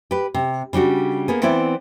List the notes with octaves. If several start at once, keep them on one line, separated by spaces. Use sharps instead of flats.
G4 B4
C3
C#3 G3 D4 F#4
A#3 B3 G#4
E3 B3 C4 E4 D5